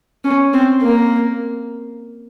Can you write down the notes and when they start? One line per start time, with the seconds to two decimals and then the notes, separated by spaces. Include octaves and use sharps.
0.24 C#4
0.54 C4
0.83 A#3